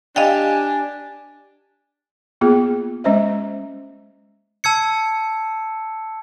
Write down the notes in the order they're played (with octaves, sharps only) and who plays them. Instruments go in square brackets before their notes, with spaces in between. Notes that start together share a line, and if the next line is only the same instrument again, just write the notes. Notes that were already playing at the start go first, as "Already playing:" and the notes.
[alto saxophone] D4 [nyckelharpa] G4 [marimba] D#5 F5 G5 [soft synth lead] G#5
[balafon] A#3 B3 F4 G#4
G#3 C#4 C5 D#5 E5
[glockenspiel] A5 E6 G#6 C#7